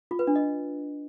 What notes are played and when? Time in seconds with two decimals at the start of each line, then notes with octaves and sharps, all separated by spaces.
0.11 F4
0.19 B4
0.27 D4
0.36 D#5